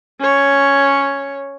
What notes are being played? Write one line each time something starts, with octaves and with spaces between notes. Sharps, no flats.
C#4 C#5